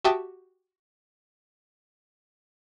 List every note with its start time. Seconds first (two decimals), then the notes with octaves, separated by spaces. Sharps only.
0.05 F#4 G4 E5 G5 A5 D#6